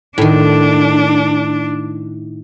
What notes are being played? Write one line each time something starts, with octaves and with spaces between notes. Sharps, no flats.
A2 D#3 D4